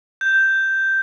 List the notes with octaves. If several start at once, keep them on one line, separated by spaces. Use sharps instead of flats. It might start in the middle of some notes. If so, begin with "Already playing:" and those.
G6